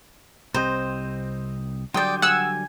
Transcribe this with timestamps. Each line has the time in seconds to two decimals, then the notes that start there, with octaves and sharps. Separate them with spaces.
0.54 C2 C4 G4 C5 D#5
1.94 D3 F#3 G3 D5 G5 C6 D#6 G6
2.22 F#5 G#5 E6